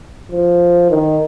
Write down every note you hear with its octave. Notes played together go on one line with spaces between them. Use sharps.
F3
D#3